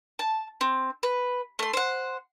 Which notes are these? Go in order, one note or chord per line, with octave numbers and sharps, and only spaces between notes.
A5
C4
B4
A3 C6
C5 F#5